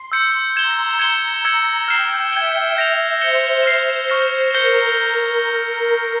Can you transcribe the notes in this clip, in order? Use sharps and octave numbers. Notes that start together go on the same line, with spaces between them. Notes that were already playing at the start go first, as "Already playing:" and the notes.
Already playing: C6
E6 G6 C#7
A#5 G#6 E7 G7
G#6 C#7 E7 G7
E6 G#6 C#7
G5 F6 C7 E7
E5 G#6 E7 G7
E5 G6 A#6 F7
C5 G6 C#7 G7
C5 F6 C7 F7
C#6 F6 A#6
A#4 G6 A#6 C#7 G7